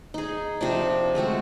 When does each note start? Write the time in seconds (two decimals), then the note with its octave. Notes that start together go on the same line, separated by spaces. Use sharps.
0.14 D#4 G#4
0.61 C3 F3 D4
1.15 G#3 A3 C4 F#4